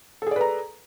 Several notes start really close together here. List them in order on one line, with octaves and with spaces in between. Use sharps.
A4 G#4 D5 B4 A#5